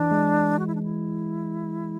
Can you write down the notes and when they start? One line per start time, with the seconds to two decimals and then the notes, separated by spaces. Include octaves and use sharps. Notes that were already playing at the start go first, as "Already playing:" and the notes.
Already playing: E3 D4
0.11 G#3
0.59 F#4
0.67 E4
0.75 D4
0.83 E4